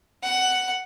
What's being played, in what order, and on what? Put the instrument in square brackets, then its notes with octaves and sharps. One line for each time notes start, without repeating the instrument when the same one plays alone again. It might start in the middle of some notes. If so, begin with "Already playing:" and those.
[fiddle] F#5